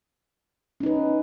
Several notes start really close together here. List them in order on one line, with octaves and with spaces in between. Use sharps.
C#4 D#4 B4